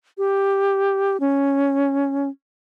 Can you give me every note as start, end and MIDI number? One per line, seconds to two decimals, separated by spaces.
0.18 1.17 67
1.20 2.28 61